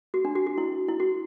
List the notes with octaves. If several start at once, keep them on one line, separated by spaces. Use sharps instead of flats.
F#4
D4
F#4
F#4
E4
E4
F#4